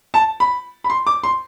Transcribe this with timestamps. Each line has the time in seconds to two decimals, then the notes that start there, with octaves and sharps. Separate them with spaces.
0.14 A5
0.40 B5
0.84 B5
0.90 C6
1.07 D6
1.24 C6